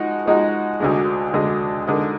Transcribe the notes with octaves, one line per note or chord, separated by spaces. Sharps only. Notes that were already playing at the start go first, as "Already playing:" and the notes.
Already playing: F3 G#3 D#4 F#4
F3 G#3 D#4 F#4
D2 D3 G#3
D2 D3 G#3
D3 G#3 D#4 A#4 D#5